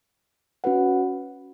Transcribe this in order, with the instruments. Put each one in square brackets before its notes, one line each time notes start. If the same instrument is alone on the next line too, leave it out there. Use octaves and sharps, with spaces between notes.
[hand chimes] C#4 F#4 B4 F#5